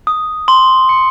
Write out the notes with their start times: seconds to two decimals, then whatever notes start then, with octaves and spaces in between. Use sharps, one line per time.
0.07 D#6
0.48 C6
0.89 C#7